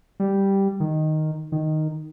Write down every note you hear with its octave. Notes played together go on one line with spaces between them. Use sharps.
G3
D#3
D#3